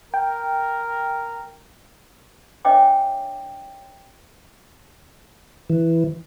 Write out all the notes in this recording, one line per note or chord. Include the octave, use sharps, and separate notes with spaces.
A#4 G5
D4 C#5 D#5 E5 G5 D6
E3